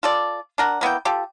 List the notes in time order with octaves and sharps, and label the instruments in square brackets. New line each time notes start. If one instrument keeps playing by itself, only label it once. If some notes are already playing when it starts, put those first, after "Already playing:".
[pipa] F4 A4 D5
D4 A#4 F#5
A#3 B3 E4 G5
F4 G4 A4